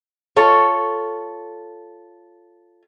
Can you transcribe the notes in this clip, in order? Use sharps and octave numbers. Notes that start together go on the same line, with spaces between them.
F4 A4 C#5